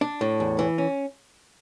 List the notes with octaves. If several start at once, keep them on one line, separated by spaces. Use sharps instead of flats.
D4
A2
E2
E3
C#4